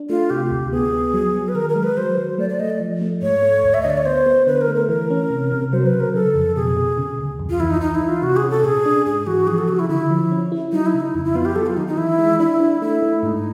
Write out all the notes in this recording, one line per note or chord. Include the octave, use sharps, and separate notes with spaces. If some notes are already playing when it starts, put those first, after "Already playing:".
Already playing: D4
A3 F4
C3 G4
D2
B3 G#4
B3
F#3
F#3
B4
D#3 A#4
A#4
G#3
B4
F#3 C5
F#3
A3 D5
D5
A3 D#5
D5
F3
A3
G#2 C#5
A3
D2
E5
D#5
D3 D5
C#5
B3 C5
B3
D3 B4
A#4
A3
A#4
E3 A#4
C#4
C3
C3
F#3 C5
B4
C#3
A#4
C#3 A4
F2
B2 G#4
B2
C#3
D2
F2
F4
E3 E4
D#4
E3 D#4
E4
E3
F4
C3 F#4
G#4
C#4
A4
A#2 G#4
D4
G#2 G#4
E3 F#4
F3 G#4
A4
C#3 F#4
E4
D3 E4
F3
C#4
E4
F#3 D#4
E4
C#3
D#4
F2 E4
E4
B3 F4
G4
F#3 A4
F4
D#3 D#4
D#4
E3 E4
G#3
D4 E4
D4
A3 E4
A3
G#2 D#4